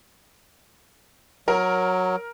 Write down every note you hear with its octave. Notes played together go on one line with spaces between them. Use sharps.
F#3 A#4